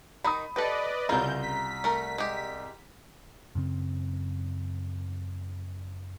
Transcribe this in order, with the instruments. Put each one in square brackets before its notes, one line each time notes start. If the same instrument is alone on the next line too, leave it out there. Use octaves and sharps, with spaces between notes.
[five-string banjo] D#3 D#4 [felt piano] B5 D#6
[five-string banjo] G4 A4 [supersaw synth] B4 D5 D#5
[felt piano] C2 A#5 [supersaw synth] C#3 G6 [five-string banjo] E4 F4
[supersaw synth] B6
[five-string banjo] A3 A#4
G#3 G4
[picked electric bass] F#2 C#3 C4